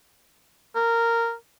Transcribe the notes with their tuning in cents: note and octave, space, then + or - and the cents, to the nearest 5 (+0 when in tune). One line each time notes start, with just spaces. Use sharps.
A#4 -10